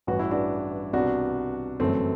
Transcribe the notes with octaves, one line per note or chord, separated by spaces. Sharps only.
A1 G2 E3 F#4
E4
D4 F#4
C2 B2 D4 F#4
G1 F#2 E3 A3 C4